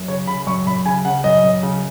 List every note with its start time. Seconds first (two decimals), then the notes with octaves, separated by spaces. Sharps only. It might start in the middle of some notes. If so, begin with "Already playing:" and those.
Already playing: F#2
0.08 C#3 C#5
0.27 C#3 B5
0.47 F#2 C#6
0.67 F#2 B5
0.86 C#3 G#5
1.05 C#3 F#5
1.24 F#2 D#5
1.43 F#2
1.63 C#3